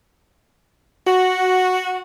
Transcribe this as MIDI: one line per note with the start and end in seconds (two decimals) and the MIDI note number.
1.07 1.99 66